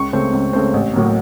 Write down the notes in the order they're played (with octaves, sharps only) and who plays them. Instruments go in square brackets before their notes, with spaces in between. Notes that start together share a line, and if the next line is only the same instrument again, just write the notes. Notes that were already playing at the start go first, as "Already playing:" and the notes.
Already playing: [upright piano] C#2 C#6
C#3 A3 C4
C#2
C#3 A3 C4
A1
A2 F#3 A#3